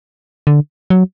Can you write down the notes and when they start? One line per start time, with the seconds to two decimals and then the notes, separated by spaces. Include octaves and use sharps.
0.47 D3
0.90 F#3